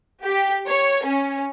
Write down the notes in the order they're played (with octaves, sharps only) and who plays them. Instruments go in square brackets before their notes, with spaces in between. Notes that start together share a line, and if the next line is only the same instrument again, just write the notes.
[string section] G4
C#5
C#4